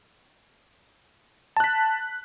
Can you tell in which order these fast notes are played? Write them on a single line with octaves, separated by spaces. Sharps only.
A5 F#6 B6